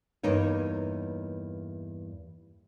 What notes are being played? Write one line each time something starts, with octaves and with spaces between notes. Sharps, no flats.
E2 G2 A#3 D#4 C#5